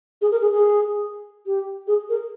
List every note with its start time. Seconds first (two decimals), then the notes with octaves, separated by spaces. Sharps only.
0.21 G#4
0.31 A#4
0.42 G#4
0.52 G#4
1.46 G4
1.87 G#4
2.09 A#4